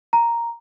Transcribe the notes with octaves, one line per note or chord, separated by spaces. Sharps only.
A#5